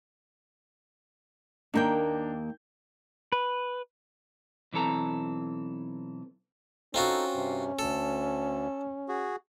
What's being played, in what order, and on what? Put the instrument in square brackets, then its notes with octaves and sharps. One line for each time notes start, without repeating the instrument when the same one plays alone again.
[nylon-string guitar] D#2 A#3 G5 [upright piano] D4 A#5 G6
[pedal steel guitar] B4
[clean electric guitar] B1 E3 C4 A4 A#5
[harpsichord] C4 F4 F#4 [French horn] C#4 [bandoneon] D#4 A4
[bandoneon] G2 C3
[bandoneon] D2 [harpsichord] A4
[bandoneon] F#4 G#4